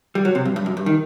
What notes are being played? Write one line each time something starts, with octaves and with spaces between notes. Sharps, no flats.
G3
F#3
C3
G2
G2
F#2
G2
D#3